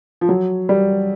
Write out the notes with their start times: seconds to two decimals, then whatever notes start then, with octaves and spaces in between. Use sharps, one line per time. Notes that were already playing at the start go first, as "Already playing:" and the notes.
0.21 F3
0.29 F#3
0.69 G3